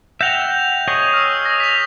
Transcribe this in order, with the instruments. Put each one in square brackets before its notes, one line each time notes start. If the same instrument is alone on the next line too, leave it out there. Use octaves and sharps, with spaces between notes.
[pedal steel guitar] E5 F#5 G5 [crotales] G6 A#6 F7
[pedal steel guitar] G#4 C#5 D#5 [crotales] C#6
[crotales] E6 F6
D#6 A#6
B6 F7